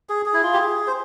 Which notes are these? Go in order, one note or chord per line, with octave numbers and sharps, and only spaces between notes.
G#4
G#4
E4
F4
G4
G#4
C5